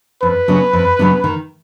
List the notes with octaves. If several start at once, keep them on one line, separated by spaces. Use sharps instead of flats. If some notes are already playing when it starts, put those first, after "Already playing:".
F2 B4
C#3 F#3 B3 D4
F2
C#3 F#3 B3 D4
D#3